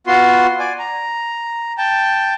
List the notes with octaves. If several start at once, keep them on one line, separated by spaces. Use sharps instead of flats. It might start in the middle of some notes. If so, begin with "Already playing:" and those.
B3 F4 F#4 C6
D5 G#5
A#5
G5 A5